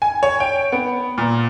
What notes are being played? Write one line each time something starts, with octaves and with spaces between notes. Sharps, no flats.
G#5
C#5
G5
B3
A#2